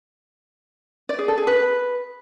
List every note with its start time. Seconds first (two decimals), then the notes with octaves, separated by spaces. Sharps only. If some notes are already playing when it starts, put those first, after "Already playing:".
1.09 D5
1.19 G#4
1.28 A4
1.38 G#4
1.47 B4